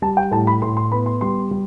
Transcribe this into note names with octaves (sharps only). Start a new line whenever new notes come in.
G3 A5
G5
A2 A5
B5
A2 C6
C6
B3 B5
C6
G3 C6
G3